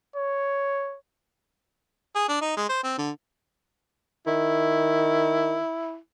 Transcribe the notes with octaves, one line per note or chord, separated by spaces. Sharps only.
C#5
G#4
D4
D#4
G#3
C5
C4
D3
D#3 E4